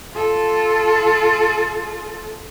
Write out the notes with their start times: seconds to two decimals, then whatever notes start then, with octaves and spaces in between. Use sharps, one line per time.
0.14 F4 A4